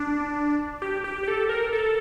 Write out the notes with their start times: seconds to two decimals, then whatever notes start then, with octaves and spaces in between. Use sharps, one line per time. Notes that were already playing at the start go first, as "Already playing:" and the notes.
Already playing: D4
0.82 G4
1.04 G4
1.23 G4
1.28 A4
1.49 A#4
1.73 A4